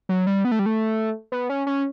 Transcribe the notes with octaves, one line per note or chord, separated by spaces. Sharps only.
F#3
G3
B3
A3
G3
A3
B3
C#4
C#4